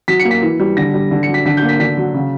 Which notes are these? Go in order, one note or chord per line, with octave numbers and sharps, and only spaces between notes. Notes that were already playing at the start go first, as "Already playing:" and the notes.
F#3 B6
C#7
A#3
B6
E3
G3
D3 A#6
G3
D3
C#7
F#3
B6
D3 B6
G6
A#3
B6
D3 B6
F#3
C#3